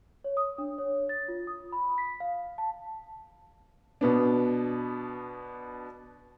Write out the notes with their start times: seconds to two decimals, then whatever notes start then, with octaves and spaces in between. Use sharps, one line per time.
0.24 C#5
0.37 D#6
0.58 D4
0.78 C#5
1.09 A6
1.28 F4
1.47 D#6
1.72 B5
1.98 B6
2.20 F5
2.58 A5
4.01 B2 B3 D4